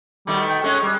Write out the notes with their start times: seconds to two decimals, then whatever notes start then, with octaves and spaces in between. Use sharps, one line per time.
0.27 B2 D#3 G3 A3
0.48 G5
0.64 G#3 A3 C#4 C#5
0.83 G3 G#3